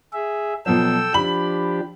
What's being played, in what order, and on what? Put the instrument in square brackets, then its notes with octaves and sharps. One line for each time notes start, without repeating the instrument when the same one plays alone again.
[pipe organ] G#4 E5
[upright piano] B2 F3 F#3 [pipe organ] A4 G5 E6
[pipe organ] F3 D4 G4 [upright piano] B5 F#7